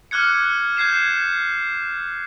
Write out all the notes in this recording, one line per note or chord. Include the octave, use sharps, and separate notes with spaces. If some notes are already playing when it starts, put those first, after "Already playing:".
D6 F6 F#6 G#6 C#7
G6 G#6 C7 E7